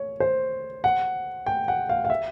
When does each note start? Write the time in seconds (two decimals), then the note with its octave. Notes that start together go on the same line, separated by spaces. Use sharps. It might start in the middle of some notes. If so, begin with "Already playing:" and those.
Already playing: C#5
0.20 C5
0.84 F#5
1.46 G5
1.68 F#5
1.89 F5
2.04 F5
2.10 E5